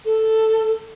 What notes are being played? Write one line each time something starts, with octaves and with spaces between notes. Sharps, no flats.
A4